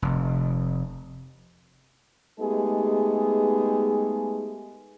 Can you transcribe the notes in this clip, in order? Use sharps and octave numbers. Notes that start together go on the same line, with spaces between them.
F1
G#3 A3 B3 D#4 G4 G#4